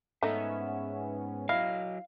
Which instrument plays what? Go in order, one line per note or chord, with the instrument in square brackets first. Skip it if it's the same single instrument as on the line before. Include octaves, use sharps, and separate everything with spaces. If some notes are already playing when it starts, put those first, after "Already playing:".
[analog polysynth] G#2 B3 C#4 [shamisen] A3 D#4 [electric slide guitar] E5
[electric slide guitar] F#3 D#5 [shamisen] E4 [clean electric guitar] F5